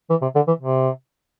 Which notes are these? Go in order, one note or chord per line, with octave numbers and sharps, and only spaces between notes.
E3
C3
D3
E3
C3